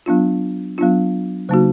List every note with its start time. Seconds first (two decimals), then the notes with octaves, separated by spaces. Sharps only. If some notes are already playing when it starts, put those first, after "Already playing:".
0.06 F#3 B3 D4 F4
0.78 F#3 B3 D4 F4
1.49 C#3 F#3 A#3 D#4 F#4